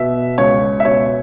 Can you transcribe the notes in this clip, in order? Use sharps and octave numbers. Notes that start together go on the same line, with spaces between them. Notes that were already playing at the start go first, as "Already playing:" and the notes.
Already playing: B2 E5
C#2 C#5
E5
B2 C#5